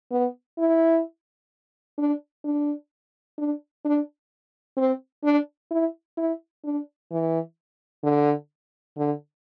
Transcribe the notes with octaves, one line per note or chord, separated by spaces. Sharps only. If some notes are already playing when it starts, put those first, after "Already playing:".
B3
E4
D4
D4
D4
D4
C4
D4
E4
E4
D4
E3
D3
D3